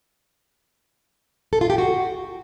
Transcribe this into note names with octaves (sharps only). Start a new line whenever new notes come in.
A4
F4
G4
F#4